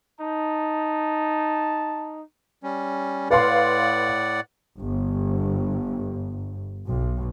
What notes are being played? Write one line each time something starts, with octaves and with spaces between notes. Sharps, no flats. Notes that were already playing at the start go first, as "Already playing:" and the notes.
D#4 A5
G3 C#4
A2 B4 D5 F5 F#5 C6
G1
B1